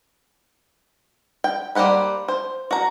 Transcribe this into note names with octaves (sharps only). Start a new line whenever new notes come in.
G5
G3 A#3 C5 F#5 B5
C5
F#4 A#5